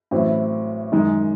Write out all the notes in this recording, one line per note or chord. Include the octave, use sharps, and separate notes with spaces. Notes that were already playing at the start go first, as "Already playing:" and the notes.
A1 A2 F#3 C4 E4
F#2 D#3 G#3 D#4